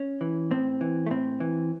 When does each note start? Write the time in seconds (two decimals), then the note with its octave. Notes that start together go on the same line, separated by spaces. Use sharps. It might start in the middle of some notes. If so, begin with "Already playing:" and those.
Already playing: C#4
0.21 E3
0.51 A2 C4
0.81 E3
1.06 A3
1.11 A2 C4
1.40 E3